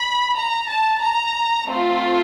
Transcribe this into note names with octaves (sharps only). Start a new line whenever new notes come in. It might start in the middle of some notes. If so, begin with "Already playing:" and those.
Already playing: B5
A#5
A5
A#5
A3 C4 F4